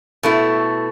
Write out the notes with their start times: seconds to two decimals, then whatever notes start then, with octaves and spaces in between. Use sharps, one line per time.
0.23 B2 A3 E4